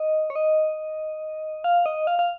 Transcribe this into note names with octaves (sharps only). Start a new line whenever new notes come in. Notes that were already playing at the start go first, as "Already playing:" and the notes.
Already playing: D#5
C#5
D#5
F5
D#5
F5
F5